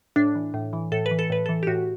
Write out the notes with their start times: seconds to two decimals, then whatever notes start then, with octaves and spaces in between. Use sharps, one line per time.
0.16 A2 D4
0.35 E3
0.54 A2
0.73 E3
0.92 A2 A4
1.06 B4
1.11 E3
1.19 A4
1.30 A2 B4
1.46 E3 A4
1.63 G4
1.67 A2 F#4